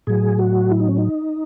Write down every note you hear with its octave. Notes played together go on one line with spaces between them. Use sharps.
A2 F#3 G#4
F#4
E4
D#4
C#4
D#4